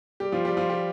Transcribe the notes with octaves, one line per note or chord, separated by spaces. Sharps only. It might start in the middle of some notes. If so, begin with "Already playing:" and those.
G3 G4
F3 F4
G3 G4
F3 F4
G3 G4